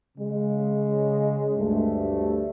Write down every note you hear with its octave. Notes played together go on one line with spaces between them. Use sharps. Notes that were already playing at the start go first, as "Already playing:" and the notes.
C#3 G#3
D2 G2 G3 A3